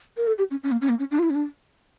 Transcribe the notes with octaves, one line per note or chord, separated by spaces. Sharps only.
A#4
A4
G4
C#4
C#4
A#3
C#4
A#3
C#4
D4
F4
E4
C#4
D4